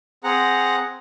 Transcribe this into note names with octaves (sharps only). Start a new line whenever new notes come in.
C4 G#4 F#5 A#5